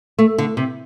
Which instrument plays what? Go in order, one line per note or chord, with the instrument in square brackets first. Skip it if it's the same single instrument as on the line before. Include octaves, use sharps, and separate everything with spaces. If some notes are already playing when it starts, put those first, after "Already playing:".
[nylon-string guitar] A3
D3
C3